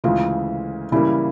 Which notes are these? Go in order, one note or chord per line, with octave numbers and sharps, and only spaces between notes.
D2 C#3 E3 G#3 F4
C#3 E3 G3 A#3 E4